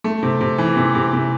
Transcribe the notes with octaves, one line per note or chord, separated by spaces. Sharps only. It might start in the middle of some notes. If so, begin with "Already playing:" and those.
A3
C3
C3
E3
C3
C3
C3